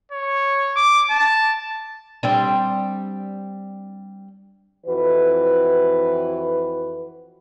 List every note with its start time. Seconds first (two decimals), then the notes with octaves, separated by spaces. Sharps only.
0.12 C#5
0.76 D6
1.11 A5
2.23 G3 C4 D4
4.87 F2 E3 F#4 B4